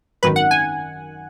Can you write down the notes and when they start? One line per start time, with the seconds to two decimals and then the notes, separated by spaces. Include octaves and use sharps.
0.23 G#1 F#2 D#3 B4
0.36 F#5
0.51 G#5